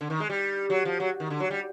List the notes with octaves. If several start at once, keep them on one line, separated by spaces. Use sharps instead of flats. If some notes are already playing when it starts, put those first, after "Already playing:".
D3
D#3
G#3
G3
F#3
F3
F#3
D#3
D3
F#3
G3